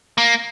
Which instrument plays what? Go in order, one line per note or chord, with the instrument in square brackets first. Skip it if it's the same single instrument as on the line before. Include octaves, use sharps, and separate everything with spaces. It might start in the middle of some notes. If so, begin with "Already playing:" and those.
[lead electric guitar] A#3